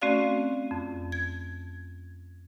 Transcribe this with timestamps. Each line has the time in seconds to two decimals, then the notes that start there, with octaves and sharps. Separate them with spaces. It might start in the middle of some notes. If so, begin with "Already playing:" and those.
0.02 A3 C4 C#4 F#4 D5 F5
0.71 F2
1.12 G#6